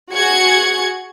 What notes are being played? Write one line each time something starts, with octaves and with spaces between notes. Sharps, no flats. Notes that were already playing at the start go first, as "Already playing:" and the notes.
F#4 G#4 G#6 C#7